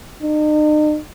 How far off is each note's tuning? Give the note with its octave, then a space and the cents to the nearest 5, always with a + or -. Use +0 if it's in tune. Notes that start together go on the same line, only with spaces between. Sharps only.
D#4 -40